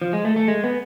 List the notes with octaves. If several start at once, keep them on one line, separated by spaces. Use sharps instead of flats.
F3
G#3
A3
A3
G#3
B3